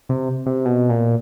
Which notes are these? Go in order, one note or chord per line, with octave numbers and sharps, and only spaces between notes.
C3
C3
B2
A#2